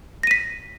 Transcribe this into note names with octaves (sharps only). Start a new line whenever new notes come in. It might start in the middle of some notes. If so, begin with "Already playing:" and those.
A#6 B6 D#7